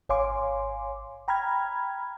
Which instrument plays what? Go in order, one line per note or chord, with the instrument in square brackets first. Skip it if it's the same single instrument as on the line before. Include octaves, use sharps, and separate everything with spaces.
[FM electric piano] G#1 C#5 F5 G#5 C6 D6
G5 A#5 B5 F6 G#6